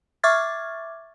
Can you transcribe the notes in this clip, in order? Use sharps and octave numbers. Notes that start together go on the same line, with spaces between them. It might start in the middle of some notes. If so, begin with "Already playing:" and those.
E5 C#6 D6 F6 G#6 A6